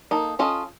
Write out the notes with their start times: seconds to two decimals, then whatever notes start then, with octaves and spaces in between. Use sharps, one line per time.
0.11 A#3 D#4 A4
0.39 C#4 F4 A4 D#5